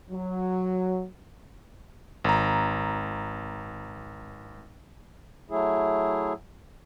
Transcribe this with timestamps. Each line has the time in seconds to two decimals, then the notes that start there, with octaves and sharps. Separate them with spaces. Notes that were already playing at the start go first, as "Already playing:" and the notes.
0.11 F#3
2.24 G#1 A#5
5.50 F#3 A3 E4 G#4